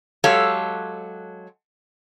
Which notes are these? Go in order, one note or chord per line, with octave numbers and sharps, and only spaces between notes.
F#3 G#3 G4 A4 C#5 F5